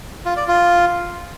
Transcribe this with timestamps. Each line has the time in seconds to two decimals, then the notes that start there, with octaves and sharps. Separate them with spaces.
0.25 F4
0.37 D5
0.48 F4